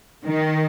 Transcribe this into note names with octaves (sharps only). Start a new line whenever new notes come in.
D#3